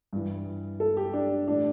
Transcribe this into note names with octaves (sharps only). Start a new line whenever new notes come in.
G2 E3
A4
G4
D4
A2 E3 D4